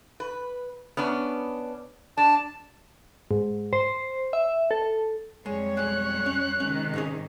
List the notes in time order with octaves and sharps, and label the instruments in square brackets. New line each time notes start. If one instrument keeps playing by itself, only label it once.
[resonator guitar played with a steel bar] B4
B3 C#4 D4
[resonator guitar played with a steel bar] D4 [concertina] A5
[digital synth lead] G#2
C5
E5
A4
[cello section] F2 G3 C#5 [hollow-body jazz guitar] G#3
[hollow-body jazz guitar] B1 G#3 [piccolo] F#6
[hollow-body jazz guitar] C#4
[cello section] C3 D#3 G#3 [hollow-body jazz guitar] C#4
[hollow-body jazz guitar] G#2 C#4 G#4